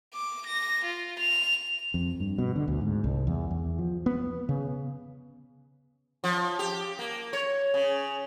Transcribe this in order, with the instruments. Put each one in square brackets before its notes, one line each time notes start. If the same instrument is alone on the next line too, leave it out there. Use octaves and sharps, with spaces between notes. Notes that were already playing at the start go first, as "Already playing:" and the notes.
[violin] D6
A#6
F4
F7
[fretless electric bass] F2
G2
B2
D3
D2
G#2
C2
E2
E2
F3
B3
C#3
[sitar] F3
G4
A#3
C#5
C#3